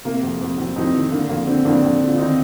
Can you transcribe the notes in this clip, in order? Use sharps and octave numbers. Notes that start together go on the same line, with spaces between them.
C3 A#3
F2
F2
F2 C4
F2 C4 D#4
D#3 C4
D3 A#3
F2 A#3
D3 C4
F2 A#3 D4
F2
D3
F4
D#2 C4 D#4